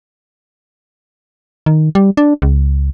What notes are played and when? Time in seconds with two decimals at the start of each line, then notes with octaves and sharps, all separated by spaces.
1.66 D#3
1.95 G3
2.17 D4
2.42 C#2